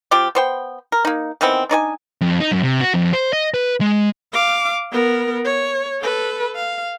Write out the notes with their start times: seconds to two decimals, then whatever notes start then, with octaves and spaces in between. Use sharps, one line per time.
0.11 F3 C4 F4 G4
0.35 B3 C5 G5
0.92 A#4
1.05 A#3 D#4
1.41 D#3 E3 B3 C4
1.69 D4 D#4 C#5 G#5
2.21 F2
2.40 D#4
2.52 F#2
2.63 C3
2.81 F#4
2.94 F2
3.13 C5
3.33 D#5
3.54 B4
3.81 G#3
4.33 F5 D6
4.92 B3 A#4
5.45 C#5
6.01 A4 B4
6.56 F5